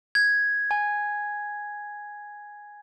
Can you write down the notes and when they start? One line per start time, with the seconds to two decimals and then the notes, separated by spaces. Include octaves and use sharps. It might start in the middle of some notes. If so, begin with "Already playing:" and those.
0.15 G#6
0.71 G#5